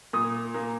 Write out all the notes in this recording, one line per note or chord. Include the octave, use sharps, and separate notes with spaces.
A#2 D#6
A#3